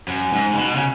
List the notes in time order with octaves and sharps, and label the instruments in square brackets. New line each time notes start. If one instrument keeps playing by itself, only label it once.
[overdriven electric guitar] F#2
G#2
C#3
B2
C#3